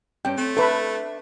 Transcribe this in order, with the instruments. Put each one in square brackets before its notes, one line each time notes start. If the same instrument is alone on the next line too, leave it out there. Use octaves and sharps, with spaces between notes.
[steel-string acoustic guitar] G2 C#4 [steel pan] G5
[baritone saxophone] A3 [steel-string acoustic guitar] C4
[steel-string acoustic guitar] D4 E5 [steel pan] A4 B4 B5